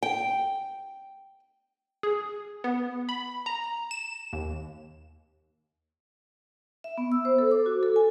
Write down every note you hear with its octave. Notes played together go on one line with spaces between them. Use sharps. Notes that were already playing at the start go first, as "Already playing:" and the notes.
G5
G#4
B3
B5
A#5
E7
D#2
E5
B3
E6
C5
A4
D6
F#4
A4
G#5